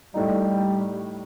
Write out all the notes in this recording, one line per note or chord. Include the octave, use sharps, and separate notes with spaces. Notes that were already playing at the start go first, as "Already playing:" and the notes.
A2 G3 A3 D#4